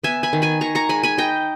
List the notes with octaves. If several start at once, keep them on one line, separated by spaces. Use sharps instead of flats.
B3 E5 G#5
G#5 B5
D#3
G#5 B5
D#3 A#5 C#6
A#5 C#6
G#3 G#5 B5
G#5 B5
D#4 D#5 G5